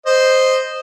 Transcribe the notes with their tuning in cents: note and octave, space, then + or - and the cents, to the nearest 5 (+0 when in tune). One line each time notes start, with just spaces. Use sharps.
C5 +0 D#5 -10